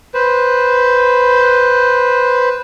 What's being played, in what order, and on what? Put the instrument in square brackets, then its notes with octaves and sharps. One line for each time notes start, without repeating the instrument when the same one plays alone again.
[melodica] B4 C5